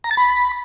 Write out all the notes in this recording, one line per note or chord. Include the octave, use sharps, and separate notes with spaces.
A#5
A6
B5